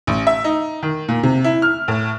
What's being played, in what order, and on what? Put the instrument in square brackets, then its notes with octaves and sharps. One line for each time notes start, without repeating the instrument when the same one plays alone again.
[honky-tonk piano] A1
E5
D#4
D#3
A#2
C3
E4
F6
A2